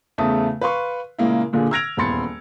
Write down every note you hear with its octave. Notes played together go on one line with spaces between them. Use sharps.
E2 C#3 A3 E5 A5 D#6
B4 F5 C6 C#6
A#2 C#3 G#3 A#3 E4
A#2 D3 A#3 F4 G#4
E6 F6 G#6 A#6 D7 F7
D#1 E2 B5 C6 A6 C#7